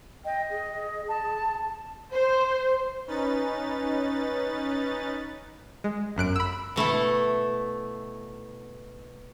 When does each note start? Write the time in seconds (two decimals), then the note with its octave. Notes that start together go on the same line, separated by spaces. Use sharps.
0.25 D#5 G5
0.50 G#4
1.08 A5
2.13 C5
3.07 C#4 D#4 B4 A6
5.84 G#3
6.16 G1 F#2 F#6 D7
6.36 B5 E6
6.76 B2 A3 E4 A4